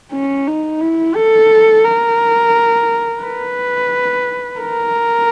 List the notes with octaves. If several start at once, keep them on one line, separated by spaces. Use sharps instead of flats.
C#4
D#4
E4
A4
A#4
B4
A#4